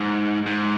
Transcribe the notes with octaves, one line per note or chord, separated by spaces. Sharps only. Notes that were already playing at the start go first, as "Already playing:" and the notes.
Already playing: G#2
G#2